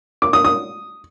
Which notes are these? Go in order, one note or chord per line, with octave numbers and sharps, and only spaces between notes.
D6
D#6
D#6